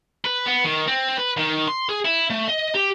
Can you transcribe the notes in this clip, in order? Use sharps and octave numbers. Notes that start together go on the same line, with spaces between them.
B4
B3
D#3
C4
B4
D#3
C6
G#4
E4
A3
D#5
G4